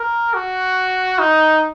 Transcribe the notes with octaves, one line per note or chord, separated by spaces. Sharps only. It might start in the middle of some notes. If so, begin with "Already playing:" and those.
Already playing: A#4
F#4
D#4